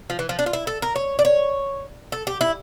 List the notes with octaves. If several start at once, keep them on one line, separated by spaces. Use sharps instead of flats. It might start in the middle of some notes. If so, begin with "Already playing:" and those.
F3
E3
F3
D4
F4
E4
A4
A#4
C#5
D5
C#5
A4
G4
E4